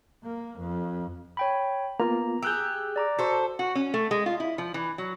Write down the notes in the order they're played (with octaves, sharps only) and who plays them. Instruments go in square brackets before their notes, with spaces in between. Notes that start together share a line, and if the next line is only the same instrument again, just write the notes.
[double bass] A#3
F2
[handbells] C#5 G5 B5
[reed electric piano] A#3 B3 F4 [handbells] A#5
[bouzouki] G4 G#4 [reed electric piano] E6 F#6 G6
[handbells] D5 A#5 D6
[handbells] F#4 [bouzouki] A4 C5
[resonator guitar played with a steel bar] F#4
C#4
A3
G#3
F4
E4
F3
E3
F#3